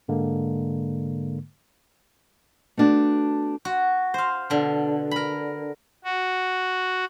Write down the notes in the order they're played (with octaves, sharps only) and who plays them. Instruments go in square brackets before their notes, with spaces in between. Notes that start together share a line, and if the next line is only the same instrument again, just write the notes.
[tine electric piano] G#2 D3 G#3 A#3
[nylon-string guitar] A3 B3 D4 F#4
[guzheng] F#4
C5 F5
B2 D3
A#4 B5
[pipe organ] F#4